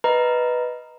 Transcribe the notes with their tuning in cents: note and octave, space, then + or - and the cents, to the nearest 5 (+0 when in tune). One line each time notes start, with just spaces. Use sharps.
B4 +0 D#5 +0 A#5 +0